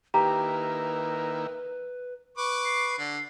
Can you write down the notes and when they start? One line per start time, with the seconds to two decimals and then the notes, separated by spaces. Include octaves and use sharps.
0.14 D#3 A#3 E4 G4 B4 A#5
2.38 B4 C#6 D6
2.65 C7
2.98 D3